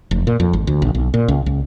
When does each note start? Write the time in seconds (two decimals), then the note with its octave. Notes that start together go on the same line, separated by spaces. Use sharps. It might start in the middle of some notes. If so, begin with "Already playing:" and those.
0.11 F1
0.27 A#2
0.40 F2
0.53 G#1
0.67 D2
0.82 A#1
0.95 B1
1.14 A#2
1.28 C#2
1.46 C#2